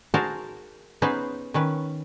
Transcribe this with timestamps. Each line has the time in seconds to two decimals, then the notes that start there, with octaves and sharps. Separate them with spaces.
0.14 D#4 F#4 G#4 A#4 C5 A5
1.02 B3 C#4 D#4 G#4 B4 C5
1.54 D#3 C#4 B4